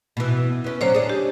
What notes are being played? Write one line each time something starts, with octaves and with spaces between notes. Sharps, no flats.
B2 E3
B3 C#4
D3 F#3 C#4 C5 C#5
D4 G#4
G4